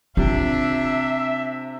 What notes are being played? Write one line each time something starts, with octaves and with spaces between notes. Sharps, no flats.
C3 D4 F4 E5